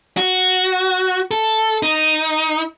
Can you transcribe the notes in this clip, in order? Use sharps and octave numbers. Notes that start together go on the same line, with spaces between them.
F#4
A4
D#4